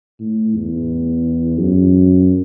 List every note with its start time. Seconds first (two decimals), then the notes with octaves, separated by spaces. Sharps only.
0.20 A2
0.55 E2
1.59 F#2